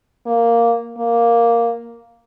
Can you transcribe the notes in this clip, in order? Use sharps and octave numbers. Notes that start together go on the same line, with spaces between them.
A#3
A#3